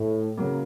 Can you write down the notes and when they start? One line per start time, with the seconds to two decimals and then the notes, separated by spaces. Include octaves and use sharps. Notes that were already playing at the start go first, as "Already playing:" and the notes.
Already playing: A2
0.37 C#3 F#3 A#3